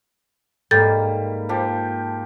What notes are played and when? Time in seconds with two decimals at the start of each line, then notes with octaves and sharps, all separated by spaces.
0.71 G#2 G3 A#3 A4 G6 A6
1.49 F3 G4